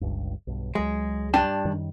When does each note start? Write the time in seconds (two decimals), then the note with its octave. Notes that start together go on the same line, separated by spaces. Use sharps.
0.01 G1 C#2 G2
0.47 B1 G2
0.75 C#2 F#3 G#3
1.34 G2 D4 G5
1.65 F#2 D#3 G3